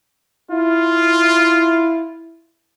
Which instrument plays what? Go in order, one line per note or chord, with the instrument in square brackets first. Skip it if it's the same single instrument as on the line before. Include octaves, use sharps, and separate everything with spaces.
[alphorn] E4 [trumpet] F4